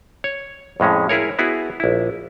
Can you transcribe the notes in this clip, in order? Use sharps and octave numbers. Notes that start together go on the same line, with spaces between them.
C#5
F2 A2 G#3 C#4
E4 G#4 A#4 C#5
B3 E4 F#4 G#4
A#1 E4